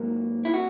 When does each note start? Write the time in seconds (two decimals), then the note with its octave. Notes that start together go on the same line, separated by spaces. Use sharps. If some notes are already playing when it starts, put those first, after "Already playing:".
Already playing: G#2 F#3 A#3
0.45 E4
0.54 F#4